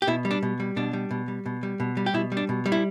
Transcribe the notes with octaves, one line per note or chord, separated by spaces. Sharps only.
G4
B2 E4
G3
D4
B2
G3
B2 D4
G3
B2
G3
B2
G3
B2
G3
G4
B2 E4
G3
D4
B2
G3
E4